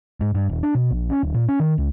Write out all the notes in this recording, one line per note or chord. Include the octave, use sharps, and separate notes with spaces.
G#2
G2
D#1
D4
B2
A#1
C#4
D1
A#2
C#4
D#3
C#2